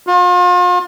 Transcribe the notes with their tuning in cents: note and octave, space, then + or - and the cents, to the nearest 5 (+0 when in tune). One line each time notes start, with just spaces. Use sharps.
F4 +40